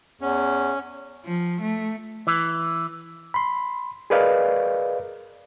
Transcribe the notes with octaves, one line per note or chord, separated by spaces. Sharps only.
E2 C#4
F3
A3
E3
B5 C6
G#4 A#4 B4 D5 D#5 F5